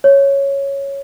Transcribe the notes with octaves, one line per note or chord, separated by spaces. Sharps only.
C#5